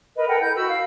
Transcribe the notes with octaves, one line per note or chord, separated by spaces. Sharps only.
A#4 B4 D#5
A4 A#4 F#5 G5
E4 G6
F#4 B5 E6
F5